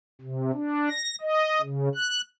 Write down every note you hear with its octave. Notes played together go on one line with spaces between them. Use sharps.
C3
D4
A#6
D#5
C#3
F#6